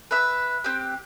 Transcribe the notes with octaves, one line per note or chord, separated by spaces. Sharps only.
B4 E5 F#6
C4 G4